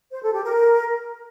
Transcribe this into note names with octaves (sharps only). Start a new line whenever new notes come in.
C5
A4
G4
A#4